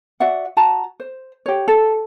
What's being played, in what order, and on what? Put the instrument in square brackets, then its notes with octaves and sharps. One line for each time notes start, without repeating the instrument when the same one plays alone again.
[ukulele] F#4 D5 E5 F#5
F#4 A5 A#5
C5
G4 C#5
A4